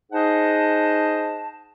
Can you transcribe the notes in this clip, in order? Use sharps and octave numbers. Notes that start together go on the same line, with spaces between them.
D#4 G#4 C5 D#5 F#5 A5